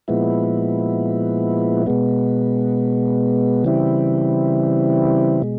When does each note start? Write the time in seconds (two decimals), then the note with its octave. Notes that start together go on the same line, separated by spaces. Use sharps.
0.08 A#2 F3 G#3 B3 E4
1.87 B2 G#3 B3
3.65 C#3 E3 G3 C4 E4
5.42 B2 G#3